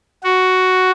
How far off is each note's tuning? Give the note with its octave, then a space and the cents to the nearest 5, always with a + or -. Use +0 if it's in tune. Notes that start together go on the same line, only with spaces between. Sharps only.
F#4 +5